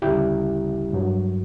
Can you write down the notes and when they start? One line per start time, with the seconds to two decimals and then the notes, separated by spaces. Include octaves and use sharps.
0.02 D2 C#3 G3 E4 G4
0.93 G2 F#3